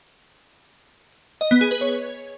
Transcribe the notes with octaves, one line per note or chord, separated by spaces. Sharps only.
D#5
B3
G#4
B4
C#5